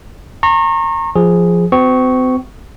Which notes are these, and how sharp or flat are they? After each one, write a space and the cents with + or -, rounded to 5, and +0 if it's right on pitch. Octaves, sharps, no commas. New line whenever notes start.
A#5 -25 C#6 -35
F3 +0 G#4 +0
C4 -40 F#4 +0 C#6 +0